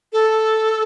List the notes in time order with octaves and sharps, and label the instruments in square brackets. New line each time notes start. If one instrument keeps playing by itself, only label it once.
[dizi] A4